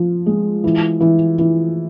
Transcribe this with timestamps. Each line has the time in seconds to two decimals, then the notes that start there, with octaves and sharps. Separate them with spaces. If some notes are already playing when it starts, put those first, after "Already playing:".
Already playing: F3
0.26 G#3
0.64 E3
1.00 E3
1.39 E3